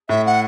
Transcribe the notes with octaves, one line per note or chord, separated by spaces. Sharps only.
A2 E5
F#5